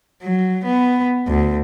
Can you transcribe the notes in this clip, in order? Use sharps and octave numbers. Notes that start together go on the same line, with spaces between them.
F#3
B3
D2